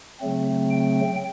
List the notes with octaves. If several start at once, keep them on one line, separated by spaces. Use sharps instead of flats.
C#3 F#3 A3 C4
G5